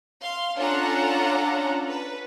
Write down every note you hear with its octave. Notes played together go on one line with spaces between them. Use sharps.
F5 C6
C#4 D4 F4 A4 F#5 A#5
B4